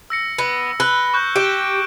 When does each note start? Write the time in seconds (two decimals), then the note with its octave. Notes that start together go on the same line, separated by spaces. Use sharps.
0.10 E6 A#6 C#7
0.38 B3 C#7
0.80 B4 E6 G7
1.14 C#6 F#6 G6
1.36 G4 D7 E7 G7